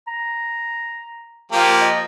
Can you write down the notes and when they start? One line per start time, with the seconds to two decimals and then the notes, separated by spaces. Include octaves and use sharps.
0.07 A#5
1.52 F3 A#3 G4
1.81 D#5